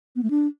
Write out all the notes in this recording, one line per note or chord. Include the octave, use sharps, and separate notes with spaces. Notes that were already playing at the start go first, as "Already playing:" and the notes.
B3
A3
D4